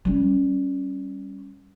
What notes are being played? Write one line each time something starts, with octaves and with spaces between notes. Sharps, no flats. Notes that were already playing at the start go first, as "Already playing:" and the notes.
G3 C#4